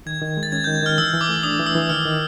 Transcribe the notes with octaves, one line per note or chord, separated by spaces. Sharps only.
D#3 G#6
D#3
G#3
A6
C#4 G#6
D#3 G6
G#6
D#3 F6
E3 E6
E3
D6
A3
D4 D#6
E3
E6
E3
D#3 F6
D#3